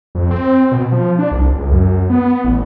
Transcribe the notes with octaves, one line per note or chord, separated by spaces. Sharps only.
F2
C4
B2
F3
D4
C2
C#2
F#2
B3
A1